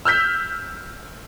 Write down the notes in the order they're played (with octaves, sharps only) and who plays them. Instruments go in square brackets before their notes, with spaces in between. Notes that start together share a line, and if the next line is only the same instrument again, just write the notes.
[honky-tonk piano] E6 F6 G6 B6